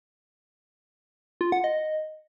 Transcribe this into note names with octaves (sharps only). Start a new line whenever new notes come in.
F4
F#5
D#5